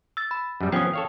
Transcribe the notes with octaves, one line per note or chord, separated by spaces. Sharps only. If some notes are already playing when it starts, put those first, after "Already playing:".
E6 A6
B5
F#2 G3
F3 B3 C#4 G5 D#6
A4 C#5 F5